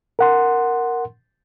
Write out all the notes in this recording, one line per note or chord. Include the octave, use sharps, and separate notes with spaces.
A#4 F#5 C6